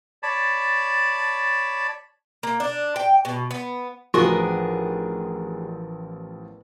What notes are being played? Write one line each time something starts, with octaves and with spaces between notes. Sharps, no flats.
C#5 D5 A5 B5
A#3
D4
G5
B2
B3
A1 F3 B3 D4 F4 F#4 G#4 A#4